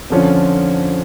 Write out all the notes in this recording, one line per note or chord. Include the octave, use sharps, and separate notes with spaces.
F2 D3 F3 C#4 F4